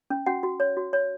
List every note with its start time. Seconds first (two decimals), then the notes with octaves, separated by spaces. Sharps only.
0.10 C#4
0.26 C#4 F#4 F#5
0.43 F#4
0.60 C#5
0.77 F#4
0.93 C#5